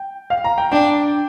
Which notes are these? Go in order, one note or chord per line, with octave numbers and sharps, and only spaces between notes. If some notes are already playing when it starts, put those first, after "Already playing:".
Already playing: G5
F5
A#5
G5
D4 G5